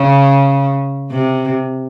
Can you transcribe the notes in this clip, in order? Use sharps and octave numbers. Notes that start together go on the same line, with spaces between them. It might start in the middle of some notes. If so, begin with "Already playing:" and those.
Already playing: C#3
C3